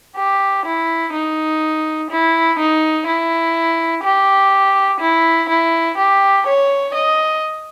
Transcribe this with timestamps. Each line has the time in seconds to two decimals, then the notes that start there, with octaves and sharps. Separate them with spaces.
0.16 G4
0.65 E4
1.14 D#4
2.11 E4
2.59 D#4
3.07 E4
4.04 G4
5.00 E4
5.49 E4
5.97 G4
6.46 C#5
6.94 D#5